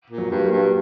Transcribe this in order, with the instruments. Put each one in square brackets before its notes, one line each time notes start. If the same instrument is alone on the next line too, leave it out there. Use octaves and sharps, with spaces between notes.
[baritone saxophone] A#2
[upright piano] F#3
[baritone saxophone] G2
[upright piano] A#3
[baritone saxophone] G2